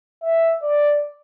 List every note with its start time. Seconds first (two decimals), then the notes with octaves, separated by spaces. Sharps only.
0.23 E5
0.62 D5